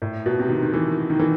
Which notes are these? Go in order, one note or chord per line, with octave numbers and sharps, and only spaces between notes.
A2
B2
C3
D#3
D#3
E3
D#3
E3